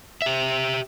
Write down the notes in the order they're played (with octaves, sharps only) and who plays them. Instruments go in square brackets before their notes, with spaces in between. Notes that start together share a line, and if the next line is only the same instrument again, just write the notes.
[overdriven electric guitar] G4 E5